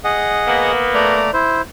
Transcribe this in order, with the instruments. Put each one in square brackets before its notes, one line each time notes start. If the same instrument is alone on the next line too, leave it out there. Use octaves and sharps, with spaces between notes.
[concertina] G#4 D#5 F#5
[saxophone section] A#3 B3
[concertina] A3 D5 A#5
E4 C5